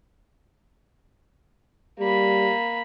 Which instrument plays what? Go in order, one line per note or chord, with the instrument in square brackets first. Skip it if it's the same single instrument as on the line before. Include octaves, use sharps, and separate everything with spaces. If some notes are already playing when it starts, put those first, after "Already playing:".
[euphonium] G3 [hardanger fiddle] A#3 B5